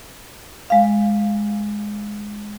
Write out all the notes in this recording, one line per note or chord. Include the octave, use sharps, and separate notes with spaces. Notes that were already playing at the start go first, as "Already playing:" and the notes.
G#3 F5